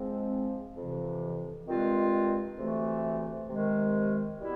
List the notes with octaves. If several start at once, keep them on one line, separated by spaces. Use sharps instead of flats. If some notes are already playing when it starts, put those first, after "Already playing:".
Already playing: G#2 F3 G#3 C4
F2 C3 E3
G2 D#3 G#3 C4 F4
D2 C3 E3 A3
C3 D#3 G#3
B2 G3 B3 E4 G4